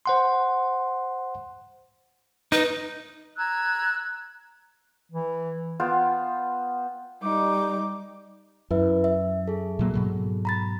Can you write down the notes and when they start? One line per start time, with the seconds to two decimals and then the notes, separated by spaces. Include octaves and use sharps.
0.06 C5 F#5 C6
2.52 D#4 B4
3.37 A#5 E6 F#6 G#6
5.12 E3
5.80 B3 F4 C5 G5
7.22 G3 D#4 D6
8.71 F#2 E4 B4 E5
9.04 E5
9.48 G#4 A4
9.79 A#2 F#3 A#3
9.94 G#2 B2 F#3
10.45 A#5 B5 A6